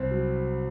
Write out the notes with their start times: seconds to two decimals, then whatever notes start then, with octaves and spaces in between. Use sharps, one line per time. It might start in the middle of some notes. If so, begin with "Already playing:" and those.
Already playing: C2 C4
0.11 F#3